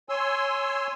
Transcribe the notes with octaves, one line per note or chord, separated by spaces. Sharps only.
C#5 G#5 C6 E6